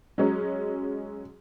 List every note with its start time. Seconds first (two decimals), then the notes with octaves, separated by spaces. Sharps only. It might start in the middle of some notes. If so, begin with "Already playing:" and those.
0.18 F#3 G#3 C#4